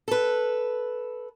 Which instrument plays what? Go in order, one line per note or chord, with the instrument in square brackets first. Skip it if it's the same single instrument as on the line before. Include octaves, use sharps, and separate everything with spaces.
[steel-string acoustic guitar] A4 B4